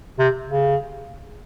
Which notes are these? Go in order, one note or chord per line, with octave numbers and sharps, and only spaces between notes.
C3
C#3